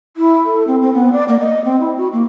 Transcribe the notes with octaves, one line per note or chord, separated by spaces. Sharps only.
E4
A4
C4
C4
B3
D5
A#3
D#5
C4
E4
F#4
A#3